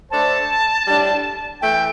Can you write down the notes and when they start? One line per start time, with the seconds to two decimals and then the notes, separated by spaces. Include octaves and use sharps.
0.11 A3 D4 A4 C5 A5
0.86 A2 G3 D4
1.61 E3 A3 G5